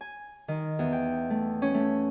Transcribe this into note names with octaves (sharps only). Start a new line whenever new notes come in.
G#5
D#3
E2
G5
A3
C#4
A3